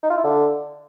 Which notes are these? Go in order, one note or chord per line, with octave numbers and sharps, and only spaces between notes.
D#4
F4
E4
D3